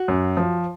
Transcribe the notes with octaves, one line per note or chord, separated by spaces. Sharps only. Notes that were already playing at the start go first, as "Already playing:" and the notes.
Already playing: F#4
F#2
F3